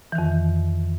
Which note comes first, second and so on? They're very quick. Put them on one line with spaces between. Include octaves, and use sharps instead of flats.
E3 D#3 F2